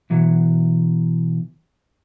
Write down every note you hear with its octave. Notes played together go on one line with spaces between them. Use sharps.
B2 E3 F#3